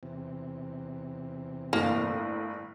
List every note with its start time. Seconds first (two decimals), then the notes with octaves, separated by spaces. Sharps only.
0.03 E2 C3
1.73 G1 A2 A#3